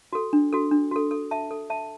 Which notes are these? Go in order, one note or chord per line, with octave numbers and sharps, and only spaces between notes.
F#4 A4
D4
F#4 A4
D4
F#4 A4
A4
E5 A5
A4
E5 A5